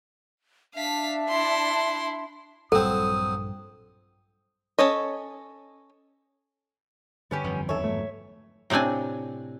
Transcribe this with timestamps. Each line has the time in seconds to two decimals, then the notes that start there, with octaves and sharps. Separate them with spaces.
0.75 D4 E5 F5 A5 B6
1.29 E4 C6
2.72 A#1 G2 F#3 C4 A4 D#6
4.79 C#4 A4 C#5 D#5
7.31 G2 D3 B3 C#4 G4
7.44 G1 F2 E3
7.69 E2 D#3 C#4 A4 C#5 E5
7.84 G#2 F#3 A3
8.70 A2 C3 C4 D4 G#5